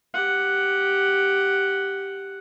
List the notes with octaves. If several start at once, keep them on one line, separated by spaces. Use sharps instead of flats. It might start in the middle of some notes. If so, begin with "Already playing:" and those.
G4 F#5